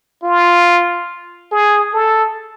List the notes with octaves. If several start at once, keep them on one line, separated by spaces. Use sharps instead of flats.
F4
G#4
A4